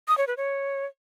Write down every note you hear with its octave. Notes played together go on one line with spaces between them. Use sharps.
D#6
C#5
B4
C#5